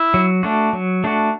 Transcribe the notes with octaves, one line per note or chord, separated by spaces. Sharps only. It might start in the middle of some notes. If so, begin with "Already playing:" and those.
Already playing: E4
F#3
A3 D4 F#4
F#3
A3 D4 F#4